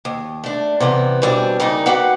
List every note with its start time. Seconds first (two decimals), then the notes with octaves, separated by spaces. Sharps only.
0.05 D#2
0.44 A3 D4
0.80 C3 E3 B3
1.22 B2 E3 G3 C4 D4
1.60 C#3 G3 A#3 D#4
1.86 F#4 G4 B4 F5 F#5